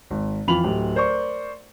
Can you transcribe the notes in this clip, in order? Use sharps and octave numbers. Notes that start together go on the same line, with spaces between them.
G#1
F2 E3 F4 B5 F7 F#7
D1 G4
A#4 C5 D5 C#6